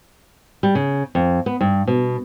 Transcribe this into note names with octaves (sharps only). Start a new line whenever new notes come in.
G3
C#3
F2
B3
G2
B2